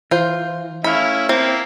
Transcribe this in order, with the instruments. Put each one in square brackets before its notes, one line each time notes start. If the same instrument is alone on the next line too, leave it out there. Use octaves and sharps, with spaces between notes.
[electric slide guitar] E3 [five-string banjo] F4 C5
[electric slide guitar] A3 F5 [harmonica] C#4 E4 [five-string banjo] B5
[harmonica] A#3 E4 [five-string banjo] C4